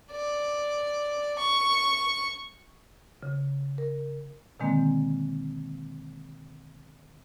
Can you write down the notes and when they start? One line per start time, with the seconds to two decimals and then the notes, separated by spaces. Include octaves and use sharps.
0.11 D5
1.38 C#6
3.23 C#3
3.78 A#4
4.60 B2 D3 D#3 G#3 A#3 C4